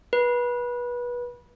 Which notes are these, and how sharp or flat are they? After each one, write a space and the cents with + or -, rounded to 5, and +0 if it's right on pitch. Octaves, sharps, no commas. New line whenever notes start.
B4 -25